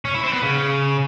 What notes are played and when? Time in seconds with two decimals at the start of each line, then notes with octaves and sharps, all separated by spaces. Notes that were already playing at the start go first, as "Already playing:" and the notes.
0.05 C#4
0.14 E4
0.23 C4
0.33 B3
0.42 C#3